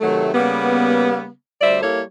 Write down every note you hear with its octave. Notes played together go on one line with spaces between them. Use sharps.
C3 D#3 F#3 A3
C#3 G3 A#3 B3
D2 G3 C5 D5 E5
G3 A#3 E4 A4 C#5